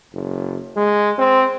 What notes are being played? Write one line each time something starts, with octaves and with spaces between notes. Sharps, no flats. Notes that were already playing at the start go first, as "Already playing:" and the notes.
F#1
G#3
C4